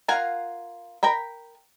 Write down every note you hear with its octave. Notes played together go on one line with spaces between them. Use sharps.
F4 A#4 F5 F#5 G#5
A#4 G5 A#5 B5